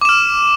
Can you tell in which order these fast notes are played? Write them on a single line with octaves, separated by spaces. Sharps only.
D6 E7 F6